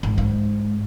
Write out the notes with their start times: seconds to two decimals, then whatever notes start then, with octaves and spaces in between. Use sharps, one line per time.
0.03 G#1
0.18 G#2